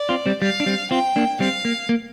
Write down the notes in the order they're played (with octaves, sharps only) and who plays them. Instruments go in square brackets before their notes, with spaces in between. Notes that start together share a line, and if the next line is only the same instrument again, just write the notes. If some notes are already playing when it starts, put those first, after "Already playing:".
Already playing: [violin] D5
[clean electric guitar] C4 F4
G3 C4
[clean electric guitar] G3 [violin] F5
[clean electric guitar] D4
G3 C4
[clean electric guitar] C4 F4 [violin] G5
[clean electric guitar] A#3 D4
[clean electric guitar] G3 C4 [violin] F5
[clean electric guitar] A#3
A#3